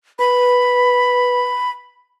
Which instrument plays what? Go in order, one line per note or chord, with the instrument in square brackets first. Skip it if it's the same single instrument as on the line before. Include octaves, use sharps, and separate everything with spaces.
[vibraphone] B4 [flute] B5